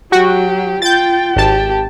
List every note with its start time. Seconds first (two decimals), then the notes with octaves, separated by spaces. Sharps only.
0.12 F#3 F#4 G4
0.82 F4 G5 G6 A6
1.36 G#1 G4 A5